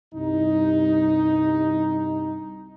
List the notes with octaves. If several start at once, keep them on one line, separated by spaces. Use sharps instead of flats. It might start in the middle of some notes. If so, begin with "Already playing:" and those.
C2 G2 D#4